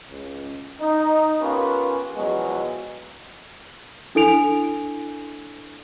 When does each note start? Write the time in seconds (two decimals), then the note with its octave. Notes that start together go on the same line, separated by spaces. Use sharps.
0.11 C#2
0.80 D#4
1.41 B3 C#4 F4 G4 A#4 B4
2.16 E2 B2 F3 F#3 G#3
4.15 D4 E4 A4 G#5 D7 F7